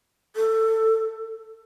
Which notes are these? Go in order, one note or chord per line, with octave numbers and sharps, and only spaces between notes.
A4